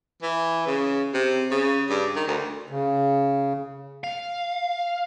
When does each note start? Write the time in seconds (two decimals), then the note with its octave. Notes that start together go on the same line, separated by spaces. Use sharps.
0.23 E3
0.67 C#3
1.14 C3
1.51 C#3
1.90 G2
2.16 D#3
2.28 D2
2.70 C#3
4.04 F5